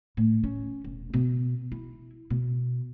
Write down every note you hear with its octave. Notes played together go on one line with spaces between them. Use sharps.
A2
C#4
E1
B2
E4
B2